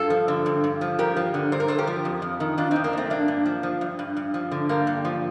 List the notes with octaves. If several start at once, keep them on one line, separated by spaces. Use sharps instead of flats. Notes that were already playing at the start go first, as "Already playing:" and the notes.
Already playing: G2 F4 A4
F3
D3
G2
G2
F3
G2 G4 A#4
F3
D3
G2 C5
A#4
G2 A4 C5
G4 A#4
F3
F2
F2
D#3
D#3 D4 F4
F2 C4 D#4
A#3 D4
F2 A3 C4
G2 A#3 D4
G2
F3
F3
G2
G2
G2
F3
D3
G2 G3 A#3
G2
F3